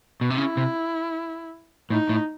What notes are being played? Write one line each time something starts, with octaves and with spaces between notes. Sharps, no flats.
B2
C3
C#3 E4
C3
A2 D#4
A2